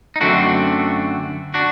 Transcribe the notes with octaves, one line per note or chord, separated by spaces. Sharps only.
D#4
F#2 D3 A3 C4 D4 F#4
D4 F#4